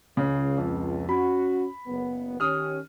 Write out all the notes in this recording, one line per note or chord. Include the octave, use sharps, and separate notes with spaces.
C#2 C#3
F2
C#4 F#4 B5
F#1 B3
D#3 C#4 G4 D#6 F6